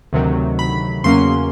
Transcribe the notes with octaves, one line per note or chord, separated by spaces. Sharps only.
D2 C3 D#3 F#3
B5
E2 C#3 F#3 A#3 C#4 C6